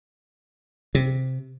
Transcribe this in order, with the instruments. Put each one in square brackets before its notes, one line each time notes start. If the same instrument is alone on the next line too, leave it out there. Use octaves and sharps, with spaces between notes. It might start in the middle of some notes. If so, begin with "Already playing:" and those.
[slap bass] C3